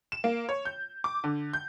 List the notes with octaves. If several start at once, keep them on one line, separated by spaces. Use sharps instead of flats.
E7
A#3
C#5
G6
D6
D3
G6